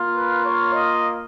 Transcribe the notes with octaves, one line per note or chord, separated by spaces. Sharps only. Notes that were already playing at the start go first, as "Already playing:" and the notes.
Already playing: A#3 F4
B4
C#5
D#5